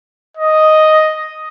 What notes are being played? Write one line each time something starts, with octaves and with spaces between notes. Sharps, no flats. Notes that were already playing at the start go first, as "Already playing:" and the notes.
D#5